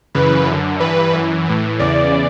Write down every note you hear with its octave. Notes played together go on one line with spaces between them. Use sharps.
F#2 C#3 E3 B4
F#2 D3
G2 E3 B4
F#2 E3
A2 E3
E2 C#3 E3 D5